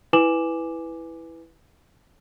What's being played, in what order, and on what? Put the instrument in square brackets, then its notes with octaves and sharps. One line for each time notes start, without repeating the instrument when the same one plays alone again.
[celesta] E4 B4 G#5 D6 E7 F#7